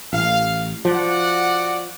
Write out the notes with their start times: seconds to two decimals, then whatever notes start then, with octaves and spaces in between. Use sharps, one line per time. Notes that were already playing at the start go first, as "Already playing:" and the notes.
0.13 A1 F5
0.85 F3 F#4 D5 F#5